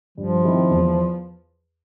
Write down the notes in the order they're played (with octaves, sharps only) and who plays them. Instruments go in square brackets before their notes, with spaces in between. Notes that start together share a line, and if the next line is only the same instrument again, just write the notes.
[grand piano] G2 [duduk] F3
[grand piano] D#3 G#3 C4 E4
E2